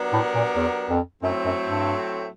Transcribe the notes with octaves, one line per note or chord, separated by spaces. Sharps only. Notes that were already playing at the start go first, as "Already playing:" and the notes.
Already playing: F#3 B3 D4 G4 A#4
A2
A#2
E2
F2
F#2 A2 F#3 A3 C4
F#2
G2